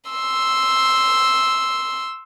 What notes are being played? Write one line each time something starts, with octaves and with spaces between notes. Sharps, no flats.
C6 E6